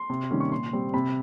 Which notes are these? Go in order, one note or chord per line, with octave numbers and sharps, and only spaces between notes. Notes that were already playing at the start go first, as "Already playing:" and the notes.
Already playing: C6
C3
D#3 G3 A#3 C#4
C#6
A#2 C6
G3 C4
C3 B5